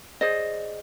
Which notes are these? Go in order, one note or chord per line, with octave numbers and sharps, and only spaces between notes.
G#4 C5 D5 D#5